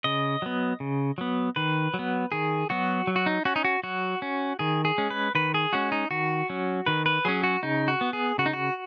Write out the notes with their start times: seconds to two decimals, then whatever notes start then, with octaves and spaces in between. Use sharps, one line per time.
0.04 C#3 D#5
0.42 F#3 B3
0.80 C#3
1.18 F#3 B3
1.56 D#3 B4
1.94 F#3
1.99 B3
2.32 D#3 G#4
2.70 F#3 B3 F#4
3.07 F#3
3.16 F#4
3.26 D#4
3.45 C#4 F#4
3.56 D#4
3.65 F#4
3.83 F#3 F#4
4.22 C#4
4.59 D#3 G#4
4.85 G#4
4.98 G#3 C#4
5.10 B4
5.35 D#3 B4
5.54 G#4
5.73 G#3 C#4 F#4
5.92 D#4
6.11 D#3 F#4
6.50 F#3 C#4
6.86 D#3 B4
7.06 B4
7.25 F#3 C#4 G#4
7.44 F#4
7.63 C#3 D#4
7.88 F#4
8.01 B3
8.13 G#4
8.38 C#3 F#4
8.46 D#4
8.53 F#4